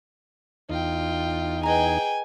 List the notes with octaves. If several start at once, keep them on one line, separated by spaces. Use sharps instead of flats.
E2 D#4 F4 G5
G#4 B4 D#5 G5 G#5 A#5